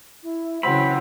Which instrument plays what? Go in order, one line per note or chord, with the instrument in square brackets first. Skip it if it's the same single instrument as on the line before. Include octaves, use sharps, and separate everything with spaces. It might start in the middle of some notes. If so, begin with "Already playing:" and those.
[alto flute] E4
[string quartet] C#3 E3 F#3 [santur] C4 [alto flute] F#5 [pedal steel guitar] B5